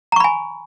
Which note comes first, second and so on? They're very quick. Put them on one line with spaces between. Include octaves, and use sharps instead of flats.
A#5 C#6 B5 G#5